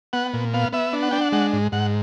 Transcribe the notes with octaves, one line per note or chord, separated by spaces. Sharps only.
B3 F#5
A#2
B3 F5
B3 E5
D4
F#5
D4 G5
F#5
G#3 F#5
G#2
G#2 F#5